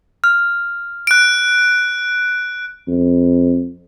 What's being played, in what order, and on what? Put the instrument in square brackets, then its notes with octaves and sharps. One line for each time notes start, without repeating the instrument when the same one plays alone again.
[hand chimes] F6
[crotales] F#6 D7
[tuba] F2